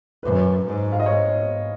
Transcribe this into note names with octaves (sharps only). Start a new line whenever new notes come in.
F#2 B4
G#2
F5
D#5
G#2 C#5